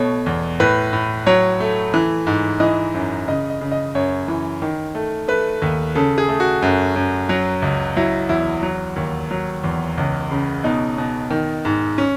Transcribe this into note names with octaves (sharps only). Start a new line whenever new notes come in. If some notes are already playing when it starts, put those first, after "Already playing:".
Already playing: B2 A3 C#5
E2
A2 B4
A2
F#3 C#5
A3
E3
G#2
E3 D#5
F#2
C#3 D#5
D#5
C#3
D#5
F#2 C#5
E3
D#3
A3
A3 B4
D#2
C#3 A4
G#4
A3
F#4
F#2
F#2
F#3
C#2
F#3 E4
E2 E4
F#3
D#2
F#3
E2
C#2
C#3
B2 D#4
B2
D#3
G#2
C#4